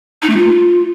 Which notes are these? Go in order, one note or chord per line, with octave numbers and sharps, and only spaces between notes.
D#4
A3
F4